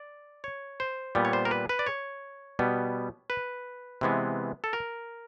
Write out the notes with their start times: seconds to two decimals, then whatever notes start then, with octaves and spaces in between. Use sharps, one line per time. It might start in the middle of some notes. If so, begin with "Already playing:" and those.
Already playing: D5
0.44 C#5
0.80 C5
1.15 A#2 G3 B3
1.25 C#5
1.33 C5
1.45 A#4
1.51 B4
1.69 B4
1.79 D5
1.86 C#5
2.59 B2 G3 B3
3.30 B4
4.01 C3 E3 G#3 B3
4.64 A4
4.73 A#4